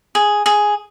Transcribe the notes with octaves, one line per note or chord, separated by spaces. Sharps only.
G#4
G#4